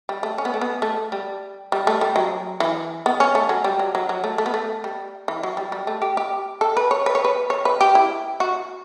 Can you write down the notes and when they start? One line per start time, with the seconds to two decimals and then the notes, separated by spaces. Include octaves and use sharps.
0.09 G3
0.23 A3
0.38 C#4
0.45 B3
0.54 A3
0.61 B3
0.82 A3
1.12 G3
1.72 G3
1.87 A3
2.01 G3
2.16 F#3
2.60 E3
3.06 B3
3.20 C#4
3.35 A3
3.49 F#3
3.64 G3
3.79 F#3
3.95 F#3
4.09 F#3
4.24 A3
4.38 A3
4.46 B3
4.54 A3
4.84 G3
5.28 E3
5.43 F#3
5.57 G3
5.72 G3
5.87 A3
6.02 G4
6.17 G4
6.61 A4
6.77 B4
6.91 C#5
7.06 B4
7.15 C#5
7.25 B4
7.50 C#5
7.65 B4
7.81 G4
7.95 E4
8.40 F#4